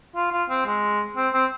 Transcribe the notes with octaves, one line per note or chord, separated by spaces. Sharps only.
F4
F4
C4
G#3
C4
C4